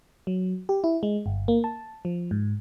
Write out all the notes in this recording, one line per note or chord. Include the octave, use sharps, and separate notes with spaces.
F#3
G4
E4
G#3
G1
A#3
A5
F3
G#2